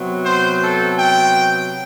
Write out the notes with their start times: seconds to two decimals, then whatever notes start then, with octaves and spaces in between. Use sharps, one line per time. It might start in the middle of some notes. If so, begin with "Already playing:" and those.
Already playing: C3 F#3 B3
0.25 C5
0.62 A4
0.99 G5